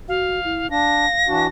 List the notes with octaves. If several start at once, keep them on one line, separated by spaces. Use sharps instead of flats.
F#4 F5
E4
D4 F5 A#6
E3 D4 F#4